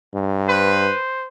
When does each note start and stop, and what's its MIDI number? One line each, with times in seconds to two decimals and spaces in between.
0.14 0.90 43
0.48 0.98 71
0.48 1.28 72